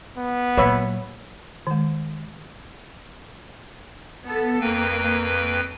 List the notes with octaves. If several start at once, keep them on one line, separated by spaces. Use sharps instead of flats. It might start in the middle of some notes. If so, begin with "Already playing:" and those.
B3
A#2 F#3 B4 C#5 E5
D#3 G#3
B3 A4
F2 A#3 B4 G5